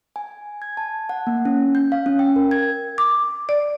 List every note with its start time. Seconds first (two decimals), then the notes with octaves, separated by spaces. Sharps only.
0.16 G#5
0.62 G#6
0.77 A5
1.09 F#5
1.27 A#3
1.45 C#4
1.75 G6
1.92 F5
2.06 C#4
2.19 G5
2.36 A#4
2.51 G#6
2.98 D6
3.49 D5